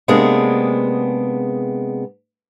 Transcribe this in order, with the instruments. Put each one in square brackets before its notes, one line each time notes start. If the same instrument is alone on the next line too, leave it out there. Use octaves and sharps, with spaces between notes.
[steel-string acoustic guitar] C3 G#3 A#3 B3 D4 G#4